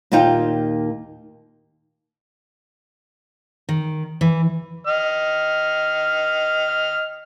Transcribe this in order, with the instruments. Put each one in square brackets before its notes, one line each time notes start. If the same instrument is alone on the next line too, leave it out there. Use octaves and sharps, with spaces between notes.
[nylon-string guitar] D#2 A#2 D#4 F4 G5
[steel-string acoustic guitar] D#3
E3
[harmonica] D#5 F6